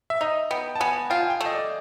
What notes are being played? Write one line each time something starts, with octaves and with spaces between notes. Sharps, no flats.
E5
D#4 D#5
B3 G5
A5
B3 G#5
F4 G5
G#5
G5
A3
D#5
D5